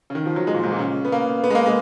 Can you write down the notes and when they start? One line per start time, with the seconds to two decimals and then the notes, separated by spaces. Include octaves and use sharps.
0.10 C#3
0.15 D#3
0.26 F3
0.36 F#3
0.47 G#3
0.54 A#2
0.63 G#2
0.72 A#2
0.79 C#3
1.05 B3
1.12 A#3
1.44 B3
1.50 G#3
1.55 A#3
1.66 G#3